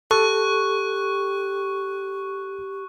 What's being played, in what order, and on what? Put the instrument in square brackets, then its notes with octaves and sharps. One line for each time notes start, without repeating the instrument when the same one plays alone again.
[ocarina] G4 [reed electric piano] A4 [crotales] C#6 F#6